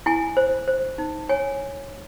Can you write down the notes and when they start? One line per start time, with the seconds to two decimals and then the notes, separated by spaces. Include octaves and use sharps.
0.06 E4 G#5
0.37 C5
0.67 C5
0.98 D#4
1.29 C#5 G#5